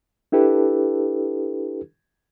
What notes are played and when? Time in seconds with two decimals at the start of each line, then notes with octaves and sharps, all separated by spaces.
0.32 D4 E4 G4 A4 B4